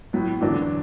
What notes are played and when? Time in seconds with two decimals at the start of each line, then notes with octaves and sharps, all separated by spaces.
0.13 A2 F#3 B3
0.41 E2 D3 F#3 D4